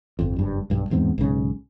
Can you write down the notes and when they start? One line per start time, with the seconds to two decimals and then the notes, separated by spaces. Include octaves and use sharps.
0.19 G1 F2
0.36 F#1 G2
0.70 B1 G2
0.90 D1 E2 G#2 C4
1.18 B1 G#2 C#3